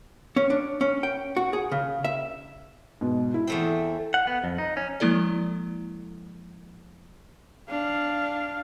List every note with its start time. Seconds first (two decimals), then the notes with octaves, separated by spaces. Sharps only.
0.36 C#4
0.50 D4
0.81 C#4
1.03 G5
1.37 F#4
1.53 G#4
1.72 C#3
2.04 E5
3.01 G#2 B2
3.34 E4
3.47 E2 A3 C4
4.14 F#5
4.27 B3
4.44 F2
4.58 D#4
4.77 C#4
5.00 F3 G#3 A#3 E4 A4 D5
7.69 D4 F5